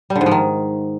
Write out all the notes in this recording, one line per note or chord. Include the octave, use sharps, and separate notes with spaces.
G3
D3
G#2
F3
D#3